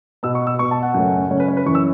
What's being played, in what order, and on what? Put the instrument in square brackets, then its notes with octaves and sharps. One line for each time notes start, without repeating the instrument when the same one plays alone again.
[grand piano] B2 B3 E6
C#6
E6
B2 B3 C#6
A5
F#5
F#2 C#3 A3 C#4
F#2 C#3 A3 C#4 C#5
B4
C#5
B4
F#2 E3 C#4 C#6
E6